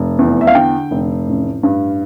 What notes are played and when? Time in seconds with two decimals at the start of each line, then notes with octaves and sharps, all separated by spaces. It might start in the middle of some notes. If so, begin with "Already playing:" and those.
Already playing: F1
0.19 E2
0.41 E5
0.47 F5
0.55 D3 G5
0.91 F1
1.27 A1
1.63 G2